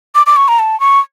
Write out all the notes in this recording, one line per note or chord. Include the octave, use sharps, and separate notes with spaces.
D6
D6
C#6
A#5
A5
C#6